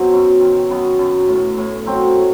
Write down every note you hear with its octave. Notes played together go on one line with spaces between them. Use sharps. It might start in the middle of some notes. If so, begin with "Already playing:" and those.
Already playing: B2 F#3 C4
F#2
D#3
F#2 B3
F#2
A2
A2
F#3 C4
A2